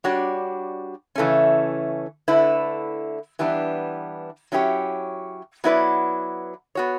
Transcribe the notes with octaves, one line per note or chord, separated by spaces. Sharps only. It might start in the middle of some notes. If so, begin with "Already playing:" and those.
G3 D4 F#4 C#5
C#3 E3 A3 C#4
D3 A3 E4 B4
E3 G3 B3 D4
F#3 C#4 E4 G4 C#5
F#3 B3 E4 B4 D5
B3 F#4 C#5